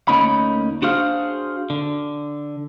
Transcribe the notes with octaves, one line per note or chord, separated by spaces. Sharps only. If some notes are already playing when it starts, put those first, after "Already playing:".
D2 C3 A#3 C#4 D#4 B5
D4 F#4 G#4 C5 F5
D3